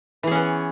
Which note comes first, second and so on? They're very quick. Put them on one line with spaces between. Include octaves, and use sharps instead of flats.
E3 G#4 C#4 B3